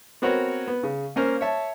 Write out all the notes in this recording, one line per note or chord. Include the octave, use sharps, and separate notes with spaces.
B3 C4 F#4 A#4 B4 C#5
B3
C#3
A#3 C#4 A#4 C5
C#5 E5 A5